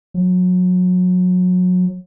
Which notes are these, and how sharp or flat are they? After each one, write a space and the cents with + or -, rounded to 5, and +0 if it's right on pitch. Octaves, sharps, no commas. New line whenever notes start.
F#3 -30